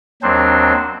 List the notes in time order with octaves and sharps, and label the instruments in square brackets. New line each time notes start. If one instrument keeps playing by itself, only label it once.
[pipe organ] D#2 F#3 C4 D4 C5